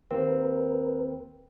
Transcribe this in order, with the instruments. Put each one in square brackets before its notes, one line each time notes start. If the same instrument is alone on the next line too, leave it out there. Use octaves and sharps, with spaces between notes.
[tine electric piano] D#2 A#3 C4 [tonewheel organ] A#4 B4